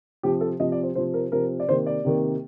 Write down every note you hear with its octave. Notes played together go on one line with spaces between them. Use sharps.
C3 F3 C4 G4
A4
C3 F3 C4 D#5
D5
C5
C3 F3 C4 C5
A#4
C3 F3 C4 A#4
D5
C3 D#3 A#3 C5
D5
C3 D#3 A#3